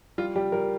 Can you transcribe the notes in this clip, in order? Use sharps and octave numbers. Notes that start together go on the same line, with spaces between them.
G3 F4
G3 G4
G3 A#4